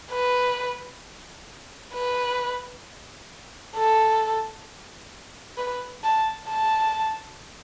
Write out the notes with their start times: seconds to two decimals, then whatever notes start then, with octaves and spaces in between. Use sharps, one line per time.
0.12 B4
1.94 B4
3.76 A4
5.57 B4
6.03 A5
6.48 A5